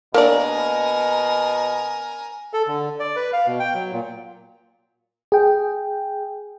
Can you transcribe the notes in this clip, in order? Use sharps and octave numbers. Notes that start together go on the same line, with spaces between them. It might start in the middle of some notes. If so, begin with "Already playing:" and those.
B2 A#3 D4 A#4 D5 G#5
A4
D3
D5
B4
F5
B2
G5
F#3
A#2
G#4 G5